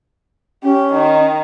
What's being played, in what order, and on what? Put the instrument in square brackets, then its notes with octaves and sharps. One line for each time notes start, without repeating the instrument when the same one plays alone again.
[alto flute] C#4 [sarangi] G4
[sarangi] D#3